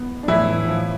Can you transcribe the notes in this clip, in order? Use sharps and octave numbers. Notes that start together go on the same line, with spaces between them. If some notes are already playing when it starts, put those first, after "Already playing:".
Already playing: B3
D4
A2 E3 E4
F3